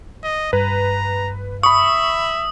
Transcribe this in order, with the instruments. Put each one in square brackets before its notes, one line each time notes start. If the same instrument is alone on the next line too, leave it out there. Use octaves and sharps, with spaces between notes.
[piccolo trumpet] D#5
[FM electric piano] G2 [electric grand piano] B4 [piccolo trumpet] A#5
[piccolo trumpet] E5 [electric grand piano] B5 C#6 [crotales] D#6